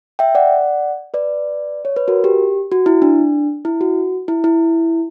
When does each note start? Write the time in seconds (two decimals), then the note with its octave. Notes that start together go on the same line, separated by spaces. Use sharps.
0.19 E5 G5
0.35 D5 F#5
1.14 B4 D5
1.85 C#5
1.96 B4
2.08 F#4 A#4
2.24 G4
2.72 F#4
2.86 E4
3.02 D4
3.65 E4
3.81 F#4
4.28 E4
4.44 E4